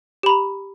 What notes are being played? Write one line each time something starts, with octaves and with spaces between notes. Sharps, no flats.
G4 A#5 B5